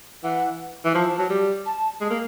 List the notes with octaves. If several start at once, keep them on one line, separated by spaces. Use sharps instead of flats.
E3 F#5
E3
F3 A5
F#3
G3
A5
G#3
A#3